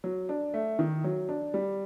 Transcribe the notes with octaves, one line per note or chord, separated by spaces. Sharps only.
F#3
D4
A3
D#3
F#3
D4
G3